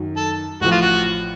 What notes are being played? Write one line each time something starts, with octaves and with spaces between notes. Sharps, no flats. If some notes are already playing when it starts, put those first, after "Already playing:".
Already playing: F#2 D#3 F#3
A4
A1 A2 F3 F#4
F4
F#4